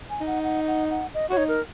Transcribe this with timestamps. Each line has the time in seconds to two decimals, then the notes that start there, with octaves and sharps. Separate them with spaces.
0.10 G#5
0.21 D#4
0.27 F#5
0.44 F#5
0.67 F#5
0.90 F#5
1.14 D#5
1.30 F#4 C#5
1.38 D#4
1.48 A#4